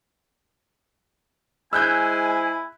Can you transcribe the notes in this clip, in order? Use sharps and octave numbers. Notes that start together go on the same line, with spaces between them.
G#3 E4 C5 G#5 E6 F#6 G6